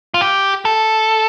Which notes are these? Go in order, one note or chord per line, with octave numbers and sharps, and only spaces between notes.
F4
G4
A4